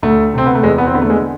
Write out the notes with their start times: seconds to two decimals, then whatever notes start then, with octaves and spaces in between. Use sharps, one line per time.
0.03 D2 A3
0.33 C3 C4
0.46 B3
0.55 A3
0.63 E2 G#3
0.78 B3
0.87 C4
0.94 D3 B3
1.02 A3
1.10 G#3